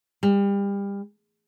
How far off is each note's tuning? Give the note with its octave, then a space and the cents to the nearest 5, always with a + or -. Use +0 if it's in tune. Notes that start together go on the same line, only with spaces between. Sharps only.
G3 +30